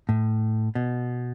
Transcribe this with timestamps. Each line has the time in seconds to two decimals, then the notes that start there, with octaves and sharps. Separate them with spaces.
0.09 A2
0.75 B2